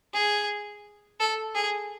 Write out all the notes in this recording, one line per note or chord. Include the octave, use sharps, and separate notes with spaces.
G#4
A4
G#4